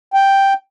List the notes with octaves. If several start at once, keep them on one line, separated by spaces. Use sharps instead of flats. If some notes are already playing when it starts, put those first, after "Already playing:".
G5